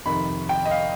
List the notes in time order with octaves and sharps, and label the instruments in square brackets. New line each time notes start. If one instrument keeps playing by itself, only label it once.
[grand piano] F2 C3 D#3 B5
G5
D#5
F5